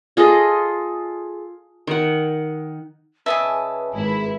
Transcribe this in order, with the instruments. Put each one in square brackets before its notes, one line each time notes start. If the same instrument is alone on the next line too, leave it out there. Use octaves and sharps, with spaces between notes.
[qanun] F4 G#4 A4 D#5
D#3 F#5
[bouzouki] C#3 G#5 A5 [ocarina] B4 [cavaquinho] D#5 E5
[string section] G#1 E4